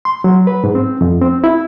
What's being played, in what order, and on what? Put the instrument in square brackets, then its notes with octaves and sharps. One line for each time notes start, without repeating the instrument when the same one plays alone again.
[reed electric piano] C6
F#3
B4
G#2
C4
F2
C4
E4